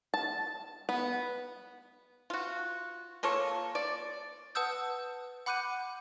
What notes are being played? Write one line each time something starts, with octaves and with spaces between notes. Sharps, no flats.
A5
B3
F4 F#4
A#3 F4 A4 C#5
D5
B4 F#5 A5 D#6 E6 G6
F#5 B5 D6 F#6 G6 D#7